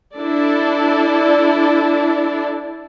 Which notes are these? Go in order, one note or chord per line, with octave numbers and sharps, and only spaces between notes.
D4 E4 A4 D5